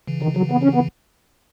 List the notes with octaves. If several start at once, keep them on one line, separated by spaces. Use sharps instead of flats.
C#3 E3
D#3
F#3
B3
C#4
B3